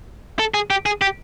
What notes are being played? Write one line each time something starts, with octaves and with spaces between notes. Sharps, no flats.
A4
G#4
G4
G#4
G4